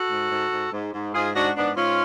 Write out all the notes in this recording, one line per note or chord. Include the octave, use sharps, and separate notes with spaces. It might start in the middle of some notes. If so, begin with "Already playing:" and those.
Already playing: F#4 A4
G#2
G#2
G#2
G#2
G#2
G#2 F4 G#4
G#2 D4 F#4
G#2 B3 D4
G#2 C#4 F4